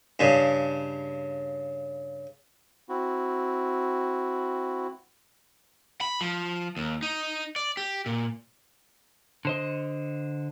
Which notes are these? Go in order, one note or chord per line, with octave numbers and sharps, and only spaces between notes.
G2 C#3
C4 E4 F#4
B5
F3
D#2
D#4
D5
G4
A#2
D3 C5 D#5